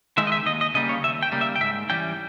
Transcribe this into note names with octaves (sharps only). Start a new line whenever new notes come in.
D#3 G#3 D#4 E5
D#5
E5
D#2 D#5
D#5
C#3 G3 A#3 D#5
C#5
D#2 E5
G5
C#3 G3 A#3
E5
G5
G#2 E5
E3 G3 C#4 G5